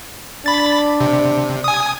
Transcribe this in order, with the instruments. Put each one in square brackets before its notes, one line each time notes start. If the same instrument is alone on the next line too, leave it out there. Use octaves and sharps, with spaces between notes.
[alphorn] D4 [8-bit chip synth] B5 A6
[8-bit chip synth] C3
G#5 D#6